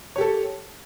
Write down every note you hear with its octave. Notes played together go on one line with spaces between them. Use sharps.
G4 A4 C#5